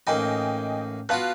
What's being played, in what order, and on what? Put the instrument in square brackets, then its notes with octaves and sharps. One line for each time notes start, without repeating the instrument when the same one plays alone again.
[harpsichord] A1 A#3 D#4 [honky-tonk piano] D#5 G5 G#5
[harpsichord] B3 F4 F#4 [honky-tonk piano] F5 A5 F#6